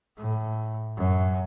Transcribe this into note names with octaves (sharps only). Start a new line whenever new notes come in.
A2
F#2